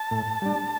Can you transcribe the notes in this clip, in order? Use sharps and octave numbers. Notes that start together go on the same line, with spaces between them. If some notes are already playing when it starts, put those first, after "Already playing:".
Already playing: A5
A2
G3 D4